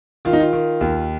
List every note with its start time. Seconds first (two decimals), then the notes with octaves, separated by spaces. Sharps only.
0.25 D#3 F4
0.33 D#4
0.40 F4
0.53 D#3
0.81 D#2